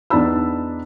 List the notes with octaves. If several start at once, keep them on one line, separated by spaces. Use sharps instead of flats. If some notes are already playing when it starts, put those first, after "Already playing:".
E2 D4 D#4 A5 B5 E6